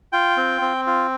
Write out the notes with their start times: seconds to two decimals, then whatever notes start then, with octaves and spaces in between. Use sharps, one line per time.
0.13 F4 G5
0.37 C4
0.62 C4
0.87 F4